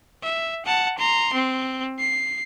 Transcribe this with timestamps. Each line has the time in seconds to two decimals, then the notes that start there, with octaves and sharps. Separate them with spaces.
0.23 E5
0.66 F#5 A5
0.98 A#5 C6
1.34 C4
1.99 C7